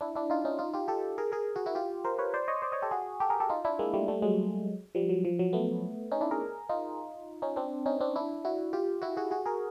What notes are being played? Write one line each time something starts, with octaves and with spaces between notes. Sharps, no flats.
D4 E4
D4 E4
D#4 F4
C#4 D#4
D#4 F4
F4 G4
G4 A4
G#4 A#4
G#4 A#4
F#4 G#4
E4 F#4
F4 G4
A#4 C5
B4 C#5
C5 D5
C#5 D#5
C5 D5
C#5 D#5
G4 A4
F#4 G#4
G4 A4
G#4 A#4
G4 A4
D#4 F4
D4 E4
G#3 A#3
G3 A3
G3 A3
F#3 G#3
F3 G3
F#3
F3
F#3
A3 B3
C#4 D#4
D4 E4
G#4 A#4
D#4 F4
C#4 D#4
C4 D4
C#4 D#4
C4 D4
D4 E4
E4 F#4
F4 G4
E4 F#4
F#4 G#4
F#4 G#4
G#4 A#4